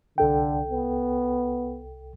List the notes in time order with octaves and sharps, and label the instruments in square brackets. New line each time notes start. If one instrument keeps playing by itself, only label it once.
[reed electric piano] C2 A4 G5 [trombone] D3
[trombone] B3